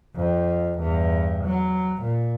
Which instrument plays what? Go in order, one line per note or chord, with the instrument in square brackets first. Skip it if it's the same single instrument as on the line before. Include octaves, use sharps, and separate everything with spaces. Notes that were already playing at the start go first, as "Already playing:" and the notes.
[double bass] F2
E2 G2
F#3
A#2